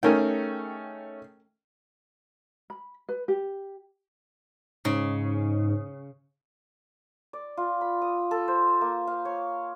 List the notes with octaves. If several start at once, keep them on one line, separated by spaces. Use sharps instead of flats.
D#3 A3 C#4 G#4 A#4 G5
B5
B4
G4
G#2 C#3
D5
F4
B5
D#6
A4
C5
A#3
F5
C#5